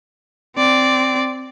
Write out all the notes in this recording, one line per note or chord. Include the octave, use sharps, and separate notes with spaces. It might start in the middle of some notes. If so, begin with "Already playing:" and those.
C4 D5